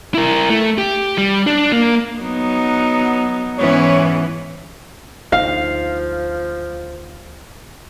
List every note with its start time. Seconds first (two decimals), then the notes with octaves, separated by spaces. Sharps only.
0.14 E4 A#4
0.50 A3
0.78 G4
1.18 G3
1.47 D4
1.72 A#3
2.21 F#3 B3 D#4
3.58 G#2 E3 B3 C#4 C#5
5.32 D2 F3 D#4 F5